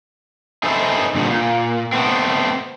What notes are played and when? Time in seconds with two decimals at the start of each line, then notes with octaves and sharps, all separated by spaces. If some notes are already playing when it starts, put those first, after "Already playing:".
0.63 D#4 G#4 A4 B4 C5 E5
1.15 G2 A#2 D3 G3
1.30 A#2
1.92 A3 B3 C4